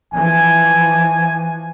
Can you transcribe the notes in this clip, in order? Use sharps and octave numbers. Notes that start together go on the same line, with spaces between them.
E3 F3 G#5